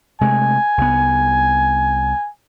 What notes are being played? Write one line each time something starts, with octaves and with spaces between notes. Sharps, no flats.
C3 G#3 A3 G#5
C2 B3